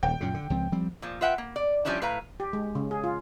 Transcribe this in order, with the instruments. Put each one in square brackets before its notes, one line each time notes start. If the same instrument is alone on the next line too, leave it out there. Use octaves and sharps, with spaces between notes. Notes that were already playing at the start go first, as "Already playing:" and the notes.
[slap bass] D#1 [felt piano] G5
[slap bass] F#2 A#2 C#3
D3
C#2 F3 C4
F3 G3 C4
[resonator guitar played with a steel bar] A#2 F3
F4 B4 E5 F#5 G5
A#3
D5
F3 G3 C#4 D4 E4
A2 B4 F5 A#5
[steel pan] G4
G#3
C#3
G#4
F4